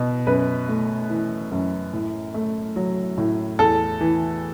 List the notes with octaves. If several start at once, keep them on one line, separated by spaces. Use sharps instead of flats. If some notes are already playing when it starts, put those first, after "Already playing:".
Already playing: B2
F#2 B4
A3
E3
F#2
A2
A3
F#3
A2
E2 A4
E3